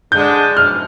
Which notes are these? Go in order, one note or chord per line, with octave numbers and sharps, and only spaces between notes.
D3 G#3 D4 G6
F6